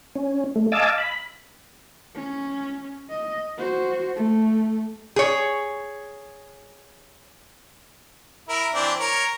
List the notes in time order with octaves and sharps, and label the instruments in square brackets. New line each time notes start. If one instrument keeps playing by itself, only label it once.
[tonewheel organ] C#4
A3
D#5 F5 G#5 A5 D6 E6
B5
[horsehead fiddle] C#4
D#5
F#4 C5
A3
[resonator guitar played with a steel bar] G#4 C#5
[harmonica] E4 A#4
E3 C4 D4
A#4 C#5